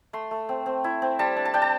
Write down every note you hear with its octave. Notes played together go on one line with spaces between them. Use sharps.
A3 C6
A3
C4
C4
E4
C4
G3 A5
D4
A5
D4 G5
A5